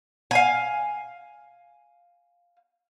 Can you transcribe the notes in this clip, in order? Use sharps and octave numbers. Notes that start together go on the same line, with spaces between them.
F5 G#5